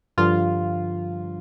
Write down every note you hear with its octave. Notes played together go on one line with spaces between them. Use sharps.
G2 D3 F3 F4